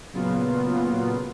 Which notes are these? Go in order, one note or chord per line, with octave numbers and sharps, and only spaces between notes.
A#2 C#3 F#3 B3 F4